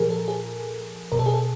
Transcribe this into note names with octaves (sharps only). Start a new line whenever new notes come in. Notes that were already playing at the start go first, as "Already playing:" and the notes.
Already playing: A#2 F3 G#4 A#4
A4
G#4
B2 A#4
A4
G#4
A4